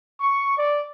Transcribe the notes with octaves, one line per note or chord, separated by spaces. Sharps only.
C#6
D5